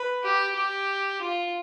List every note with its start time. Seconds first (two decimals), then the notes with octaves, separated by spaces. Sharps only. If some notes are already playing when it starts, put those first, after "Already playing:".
Already playing: B4
0.24 G4
0.56 G4
1.20 F4